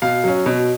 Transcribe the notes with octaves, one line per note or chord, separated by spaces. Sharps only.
B2 F5
F#3 C#4
B2